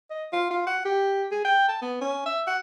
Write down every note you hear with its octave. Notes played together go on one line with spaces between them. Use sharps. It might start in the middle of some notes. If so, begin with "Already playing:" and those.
D#5
F4
F4
F#5
G4
G#4
G5
A5
B3
C#4
E5
F#5